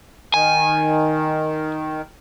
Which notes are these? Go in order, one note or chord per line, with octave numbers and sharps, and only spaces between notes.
D#3 G#5